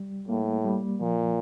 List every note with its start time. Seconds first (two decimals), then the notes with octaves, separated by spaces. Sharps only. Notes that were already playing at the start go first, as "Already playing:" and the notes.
Already playing: G3
0.28 A2 A#3
0.65 G3
1.01 A#2 F3